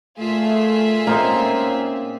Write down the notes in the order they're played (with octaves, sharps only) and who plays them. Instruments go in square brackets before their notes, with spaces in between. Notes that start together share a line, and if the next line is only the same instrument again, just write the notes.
[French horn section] A#2 A3 [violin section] F4 G#4 E5
[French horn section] A#2 C#4 [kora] A#3 C4 D#4